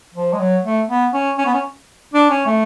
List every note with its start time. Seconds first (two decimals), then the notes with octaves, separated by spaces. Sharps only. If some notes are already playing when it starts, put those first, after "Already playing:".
0.14 F3
0.33 G#3
0.39 F#3
0.64 A3
0.88 B3
1.13 C#4
1.38 C#4
1.46 B3
1.54 C#4
2.13 D4
2.30 C#4
2.46 A3